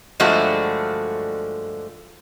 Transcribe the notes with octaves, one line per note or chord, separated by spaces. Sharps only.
G2 D3 F3 G#3 A3 F#4